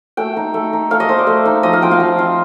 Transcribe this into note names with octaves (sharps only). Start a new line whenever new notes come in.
A3 G5
D#4
A3
D#4
A3 F5
D#5
D#4 C5
D5
A3
D#4
F3 D#5
F5
C4 F4 G5
F5
F3
C4 F4